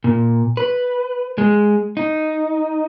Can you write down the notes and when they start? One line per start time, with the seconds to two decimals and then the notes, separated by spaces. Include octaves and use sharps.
0.04 A#2
0.57 B4
1.38 G#3
1.97 D#4